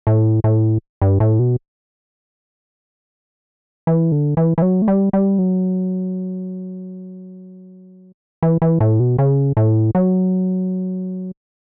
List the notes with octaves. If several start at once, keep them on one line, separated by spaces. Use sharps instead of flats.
A2
A2
G2
A2
B2
E3
D3
E3
E3
F#3
A3
G3
G3
F#3
E3
E3
A2
B2
C#3
A2
F#3